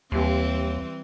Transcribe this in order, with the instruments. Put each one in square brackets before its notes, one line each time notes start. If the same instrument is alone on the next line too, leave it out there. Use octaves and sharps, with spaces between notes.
[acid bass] D#2 [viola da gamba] E3 C4 [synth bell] G3 C6